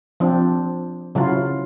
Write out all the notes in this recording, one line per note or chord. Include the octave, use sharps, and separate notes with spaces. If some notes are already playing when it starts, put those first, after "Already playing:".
F3 C4 D4
C#3 F#3 E4 F4